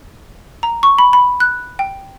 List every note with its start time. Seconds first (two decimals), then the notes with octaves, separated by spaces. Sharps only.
0.63 A#5
0.83 C#6
0.99 B5
1.13 B5
1.40 F#6
1.79 G5